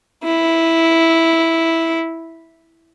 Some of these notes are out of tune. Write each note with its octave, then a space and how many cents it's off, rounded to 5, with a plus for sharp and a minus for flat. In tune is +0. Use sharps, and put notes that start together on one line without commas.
E4 -5